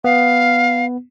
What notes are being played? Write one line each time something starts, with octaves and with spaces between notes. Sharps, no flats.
B3 F5